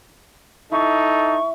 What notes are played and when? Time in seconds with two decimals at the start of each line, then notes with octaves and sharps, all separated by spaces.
0.72 D#4 E4 A4 C#6